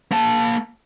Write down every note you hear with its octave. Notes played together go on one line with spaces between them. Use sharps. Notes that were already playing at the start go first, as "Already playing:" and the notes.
A#3 A5